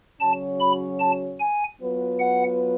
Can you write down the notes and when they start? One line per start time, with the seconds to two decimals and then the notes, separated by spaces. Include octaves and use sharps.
0.20 C#3 F#3 C#4 F#4 C#5 A5
0.60 B5
1.00 A5
1.40 G#5
1.80 F#3 B3 F4 B4
2.20 F#5